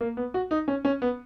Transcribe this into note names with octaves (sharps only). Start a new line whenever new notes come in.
A#3
B3
F#4
D#4
C#4
C#4
B3